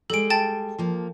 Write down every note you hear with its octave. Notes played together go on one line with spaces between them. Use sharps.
G3 G#3 A4 D7
G5 A5 A6
F3 A#3